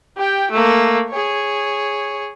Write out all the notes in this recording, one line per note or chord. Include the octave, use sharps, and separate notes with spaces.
G4 G5
A3 A#3
G#4 C#5